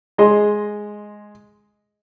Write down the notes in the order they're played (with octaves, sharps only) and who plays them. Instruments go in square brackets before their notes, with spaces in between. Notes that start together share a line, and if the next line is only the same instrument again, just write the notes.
[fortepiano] G#3 D#5 C6